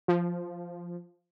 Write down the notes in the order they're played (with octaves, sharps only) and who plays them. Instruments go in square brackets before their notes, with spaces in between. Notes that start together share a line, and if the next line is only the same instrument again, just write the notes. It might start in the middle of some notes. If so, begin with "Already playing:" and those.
[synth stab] F3